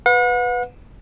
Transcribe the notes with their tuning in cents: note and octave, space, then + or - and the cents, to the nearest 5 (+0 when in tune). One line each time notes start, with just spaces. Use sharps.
B4 +0 F#5 -40